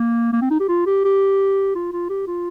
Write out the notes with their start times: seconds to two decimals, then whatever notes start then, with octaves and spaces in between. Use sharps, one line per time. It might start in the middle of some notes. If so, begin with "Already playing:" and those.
Already playing: A#3
0.33 A#3
0.41 C4
0.51 D#4
0.60 G4
0.68 F4
0.86 G4
1.04 G4
1.75 F4
1.92 F4
2.09 G4
2.27 F4